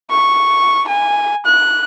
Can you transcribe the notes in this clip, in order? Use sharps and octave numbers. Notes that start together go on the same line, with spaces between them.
C#6
G#5
F#6